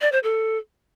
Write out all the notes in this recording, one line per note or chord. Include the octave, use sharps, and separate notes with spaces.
D5
C5
A4